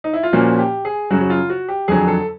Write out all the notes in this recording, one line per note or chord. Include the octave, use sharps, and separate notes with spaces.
D#4
E4
F4
A#2 F3 A#3 C#4 F#4
G4
G#4
F#2 C#3 F#3 F#4
F#4
F4
F#4
G4
F2 D3 F#3 G#4
A4